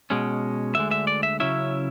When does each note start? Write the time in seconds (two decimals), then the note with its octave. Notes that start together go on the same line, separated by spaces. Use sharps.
0.10 B2 G#3 C#4
0.75 D2 D3 G#3 E5
0.91 E5
1.07 D5
1.23 E5
1.40 C#3 F#3 C#4 E4 E5